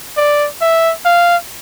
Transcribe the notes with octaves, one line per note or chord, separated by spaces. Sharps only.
D5
E5
F5